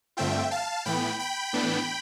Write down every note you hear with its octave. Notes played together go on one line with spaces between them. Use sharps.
G2 D3 A3 C4 F4 E5 G5
F5 A5
A2 E3 B3 G5 B5
G5 B5
A2 E3 B3 D4